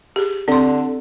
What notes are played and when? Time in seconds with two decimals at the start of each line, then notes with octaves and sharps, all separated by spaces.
0.16 G4 G#4
0.48 D3 C4 C6